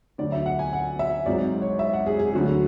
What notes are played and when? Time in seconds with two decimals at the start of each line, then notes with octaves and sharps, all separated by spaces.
0.18 D2 D3 F#3 D5
0.32 E5
0.46 F#5
0.59 G#5
0.73 F#5
0.99 E5
1.26 G#1 G#2 F#3 D5
1.62 C#5
1.79 E5
1.93 F#5
2.06 G#4
2.19 G#4
2.33 D2 D3 F#3 F#4